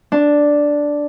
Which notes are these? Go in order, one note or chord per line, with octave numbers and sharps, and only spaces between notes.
D4